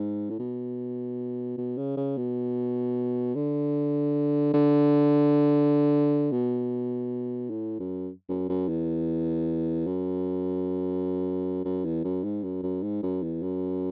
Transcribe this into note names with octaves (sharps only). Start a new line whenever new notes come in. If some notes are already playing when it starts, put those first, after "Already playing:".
Already playing: G#2
A2
B2
B2
C#3
C#3
B2
D3
D3
B2
A2
F#2
F#2
F#2
E2
F#2
F#2
E2
F#2
G#2
F#2
F#2
G#2
F#2
E2
F#2